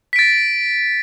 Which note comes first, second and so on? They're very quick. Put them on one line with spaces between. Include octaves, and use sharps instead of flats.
B6 D7 A6